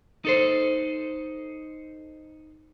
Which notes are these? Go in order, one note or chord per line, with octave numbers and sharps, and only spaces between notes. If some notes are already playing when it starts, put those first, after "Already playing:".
D#4 A4 C5